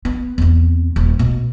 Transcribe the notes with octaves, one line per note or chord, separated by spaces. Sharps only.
B3
E2 C4
D#1
B2